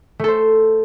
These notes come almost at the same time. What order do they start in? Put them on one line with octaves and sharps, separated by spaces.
A3 A4 C5